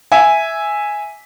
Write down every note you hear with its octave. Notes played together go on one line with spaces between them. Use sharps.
E5 G#5